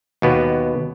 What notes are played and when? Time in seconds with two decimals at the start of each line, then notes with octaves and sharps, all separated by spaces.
0.22 D#2 B2 B3